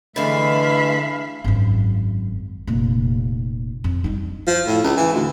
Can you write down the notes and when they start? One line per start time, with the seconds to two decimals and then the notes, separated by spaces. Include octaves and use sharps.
0.16 D3 E3 G#3 A3 E5 F5 B5
1.44 G#1 F#2
2.67 F1 A#2
3.84 F2
4.04 G3 D#4
4.47 F3
4.66 A2
4.84 C#2
4.97 E3
5.13 D2